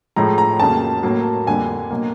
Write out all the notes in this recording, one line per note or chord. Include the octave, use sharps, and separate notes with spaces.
A2 F3 G#3 A#5
A#5
F2 C#3 F#3 A#3 A5
A2 F#3 A#3
F2 D3 G3 A#3 G#5
B2 F#3 A#3